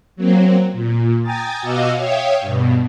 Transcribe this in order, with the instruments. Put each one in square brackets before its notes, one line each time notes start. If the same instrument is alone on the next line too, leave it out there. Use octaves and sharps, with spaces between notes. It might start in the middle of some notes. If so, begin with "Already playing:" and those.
[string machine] F#3 A#3 C4
A#2
G5 G#5 A#5 D#6 A6
B2 F#4 D#5 F5 D6 E6
C#5 E5 F5 G5 D#6
G2 B2